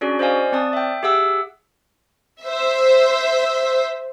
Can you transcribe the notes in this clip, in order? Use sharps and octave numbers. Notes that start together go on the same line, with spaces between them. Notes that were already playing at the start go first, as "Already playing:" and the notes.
C#4 D4 F#4 G#4 D5
C5 D5 D#5 F5 G#5
C4 D5 A5 D#6
E5 G5
G4 G#4 E5 F#5 E6
C5 E5